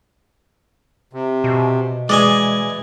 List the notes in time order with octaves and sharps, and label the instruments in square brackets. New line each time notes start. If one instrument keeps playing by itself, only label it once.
[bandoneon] C3
[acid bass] B2
[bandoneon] E3 [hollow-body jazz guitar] G#3 [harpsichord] D5 D#5 G#5